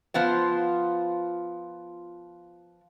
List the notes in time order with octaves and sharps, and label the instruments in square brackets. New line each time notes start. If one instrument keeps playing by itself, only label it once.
[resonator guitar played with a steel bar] F3 B3 F4 C5